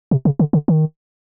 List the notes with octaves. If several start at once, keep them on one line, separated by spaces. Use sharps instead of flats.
C3
C#3
D3
D3
D#3